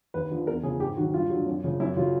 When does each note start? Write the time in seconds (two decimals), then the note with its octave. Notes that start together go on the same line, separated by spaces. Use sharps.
0.14 D#2 B4
0.30 D3 F3
0.47 E2 A#4
0.63 C#3 F3 G#4
0.80 G#2 G4
0.97 D#3 F#3 F#4
1.14 G2 F4
1.30 D3 F#3
1.46 F#2
1.64 C#3 F3
1.80 F#2 E4
1.97 C#3 F#3 F4